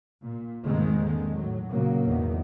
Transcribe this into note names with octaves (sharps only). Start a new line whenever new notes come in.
A#2
E2 G#2 D#3 G#3 A#3 C4
D3 D#3 G#3
A2 F#3
A#2 C#3 F#3 A#3
G#1 E2 D#3